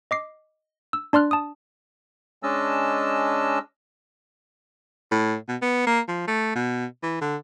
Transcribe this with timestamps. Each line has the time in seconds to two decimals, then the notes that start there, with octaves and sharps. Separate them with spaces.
0.11 D#5 D6 C7
0.93 E6
1.13 D4 D5 C6 F6 F#6
1.31 A5 D#6
2.43 G#3 C#4 D4 D#5 A5 E6
5.11 A2
5.48 B2
5.62 B3
5.87 A#3
6.08 F3
6.28 A3
6.55 B2
7.03 E3
7.21 D3